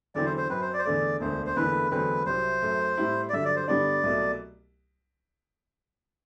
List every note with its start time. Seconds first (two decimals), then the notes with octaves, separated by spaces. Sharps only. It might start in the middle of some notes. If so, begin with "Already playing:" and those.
0.15 E2 D3 F#3 C4 E4 D5
0.26 C5
0.37 C5
0.49 F#2 F#3 C4 B4
0.62 C5
0.74 D5
0.79 C5
0.85 E2 D3 A3 D5
1.20 E1 D2 D3 C5
1.46 C5
1.56 F#1 E2 D3 A3 E4 B4
1.91 E2 D3 F#3 A3 C4 B4
2.26 C2 C3 F#3 C5
2.62 F#2 F#3 A3
2.97 A2 G3 C4 E4
3.29 D5
3.33 G2 D3 F#3 E5
3.45 D5
3.56 C5
3.68 G2 D3 G3 B3 D4 D5
4.03 C2 B2 F#3 A3